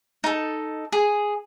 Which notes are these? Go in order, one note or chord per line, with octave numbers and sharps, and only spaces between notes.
D#4 A4
G#4